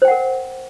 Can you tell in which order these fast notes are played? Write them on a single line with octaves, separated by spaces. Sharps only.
C5 G5 F#5 A#4